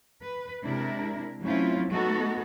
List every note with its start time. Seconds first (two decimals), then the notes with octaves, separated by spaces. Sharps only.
0.23 B4
0.65 C3 G#3 D4 E4 A#4
1.43 F#3 A3 C4 C#4 E4 F4
1.89 A3 B3 D#4 F#4 A4